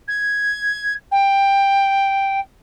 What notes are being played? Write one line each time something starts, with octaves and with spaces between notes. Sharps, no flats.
G#6
G5